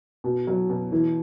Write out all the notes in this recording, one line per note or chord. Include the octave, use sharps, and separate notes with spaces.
B2
F#3
B2
E3